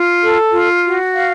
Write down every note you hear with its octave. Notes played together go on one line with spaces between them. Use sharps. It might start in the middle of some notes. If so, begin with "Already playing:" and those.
Already playing: F4
A4
F4
F#4
F5